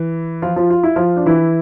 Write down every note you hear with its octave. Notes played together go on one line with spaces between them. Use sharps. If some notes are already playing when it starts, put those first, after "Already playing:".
Already playing: E3
F3 F4
F3 F4
F4
E4
F3 F4
D4
E3 E4